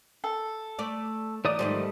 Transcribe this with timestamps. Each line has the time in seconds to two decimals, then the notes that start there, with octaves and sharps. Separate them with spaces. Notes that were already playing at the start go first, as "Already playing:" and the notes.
0.24 A4
0.79 A3 D5
1.45 E3 D#4 D5 D#6
1.59 G#2 D#3 F3 G3 A3 D#5